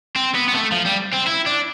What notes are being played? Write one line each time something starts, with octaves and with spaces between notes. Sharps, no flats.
C4
B3
B3
A3
F3
G3
C4
E4
D4